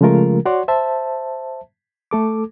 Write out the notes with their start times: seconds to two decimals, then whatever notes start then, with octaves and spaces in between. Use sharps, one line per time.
0.01 C#3 F3 G#3 A3 F4 A#4
0.46 F#4 C#5 D5 F#5 C6
0.68 C5 E5 A5
2.11 A3 A4 D6